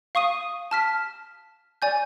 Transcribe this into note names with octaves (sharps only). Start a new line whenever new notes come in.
F5 C#6 D#6 D#7
A5 F6 B6
D5 G#5 G6